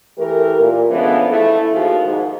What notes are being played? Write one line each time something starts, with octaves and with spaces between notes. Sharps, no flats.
E3 A3 G4 A#4
A#2
D3 E3 F3 G#3 B3 C#4
A3 E4
D#2 D#3 F3 F#4 G#4
G#2